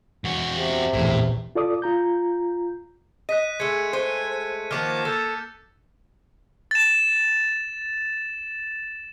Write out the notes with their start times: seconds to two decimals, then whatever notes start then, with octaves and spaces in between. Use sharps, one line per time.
0.24 E2 F#4
0.57 C3
0.94 A#1 E2 A2
1.55 F4 A4 D5 D6 D#6
1.82 F4 A#5 G6
3.29 D#5 F#6 B6 D#7
3.60 G#3 A3 G#6 C#7
3.93 C5 G#5
4.71 D#3 F3 A#3 F#5 A5 D6 F6
5.05 A4 E6 G6 A6
6.71 A6 E7